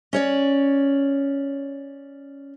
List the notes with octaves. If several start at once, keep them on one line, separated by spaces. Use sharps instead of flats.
C#4 C#5 D5